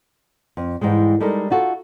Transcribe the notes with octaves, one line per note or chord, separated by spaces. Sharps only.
F2
G#2 E3 G3 G#3
G3 G#3 D#4 A4 A#4
D#4 F4 F#4 A4